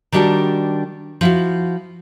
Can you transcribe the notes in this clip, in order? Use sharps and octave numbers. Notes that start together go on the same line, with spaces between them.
D#3 G3 D4 F#4 A5
F3 E4 F#4